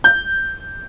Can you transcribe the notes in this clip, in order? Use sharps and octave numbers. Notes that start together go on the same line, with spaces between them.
G6